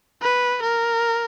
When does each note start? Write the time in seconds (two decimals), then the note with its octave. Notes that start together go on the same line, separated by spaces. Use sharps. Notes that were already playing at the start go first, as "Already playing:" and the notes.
0.22 B4
0.62 A#4